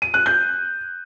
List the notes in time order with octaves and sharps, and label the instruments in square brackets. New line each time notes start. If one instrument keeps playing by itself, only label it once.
[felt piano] D#7
F#6
G6